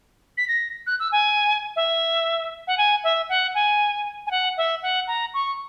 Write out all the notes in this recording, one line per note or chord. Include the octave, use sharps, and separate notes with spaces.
B6
A#6
F#6
E6
G#5
E5
F#5
G#5
E5
F#5
G#5
G#5
F#5
E5
F#5
A#5
C#6